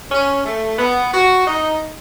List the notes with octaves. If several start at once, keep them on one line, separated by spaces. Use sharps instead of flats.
C#4
A3
B3
F#4
D#4